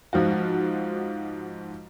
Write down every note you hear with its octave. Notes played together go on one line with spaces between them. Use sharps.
G#2 F3 F4 F#4